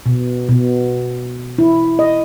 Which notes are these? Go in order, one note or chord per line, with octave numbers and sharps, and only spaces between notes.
B2
B2
E4
D#5